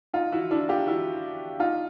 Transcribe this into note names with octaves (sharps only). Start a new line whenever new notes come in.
D#4 F4
E4 F#4
D4 E4
F4 G4
E4 F#4
D#4 F4